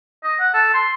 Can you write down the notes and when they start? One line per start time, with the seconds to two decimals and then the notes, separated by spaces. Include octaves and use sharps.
0.24 D#5
0.40 F#5
0.54 A4
0.74 C6